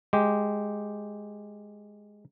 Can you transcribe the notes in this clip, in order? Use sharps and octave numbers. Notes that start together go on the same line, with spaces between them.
G#3 G4